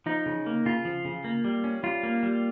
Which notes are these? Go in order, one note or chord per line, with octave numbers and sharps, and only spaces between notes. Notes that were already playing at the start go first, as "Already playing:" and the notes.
F3 D#4
C#3
A#3
C#3 F4
F3
C#3
A#3
G3
C#4
G3 F4
A#3
G3